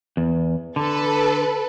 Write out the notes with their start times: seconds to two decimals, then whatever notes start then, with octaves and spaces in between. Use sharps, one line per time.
0.17 E2
0.76 D3 A4 B4